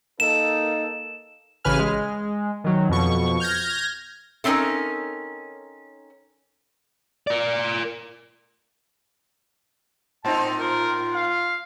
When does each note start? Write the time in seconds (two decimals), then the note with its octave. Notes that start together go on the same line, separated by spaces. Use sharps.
0.20 A#3 D#4 A4 E7
1.65 A1 C#3 B4 G#5 F6
1.79 G#3
2.64 D#3 F#3
2.89 F2 B2 C#6
3.40 F6 G6 G#6 A#6
4.44 A3 C4 C#4 D#4 A4 A#4
7.27 A#4 D5
10.25 A2 C4 D#4 A5
10.59 F4 A#4
11.13 F5